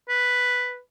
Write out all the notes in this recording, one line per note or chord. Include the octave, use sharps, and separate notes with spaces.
B4